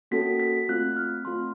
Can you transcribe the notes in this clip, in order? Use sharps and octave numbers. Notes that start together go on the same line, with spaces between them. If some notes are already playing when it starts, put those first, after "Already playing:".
A#3 C#4 F#4 A4 B6
B6
A3 C4 F4 F#6
F6
A3 C4 F4 C6